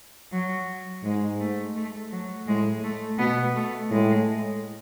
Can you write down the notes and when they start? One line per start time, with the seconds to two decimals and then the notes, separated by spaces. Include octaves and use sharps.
0.32 F#3
1.04 G#2 G#3
1.40 A3
1.76 A3
2.12 F#3
2.47 A2 G#3
2.83 A3
3.19 B2 B3
3.55 A3
3.91 A2 G#3